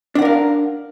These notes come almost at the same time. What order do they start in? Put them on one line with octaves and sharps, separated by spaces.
D4 F#5 A#4 F5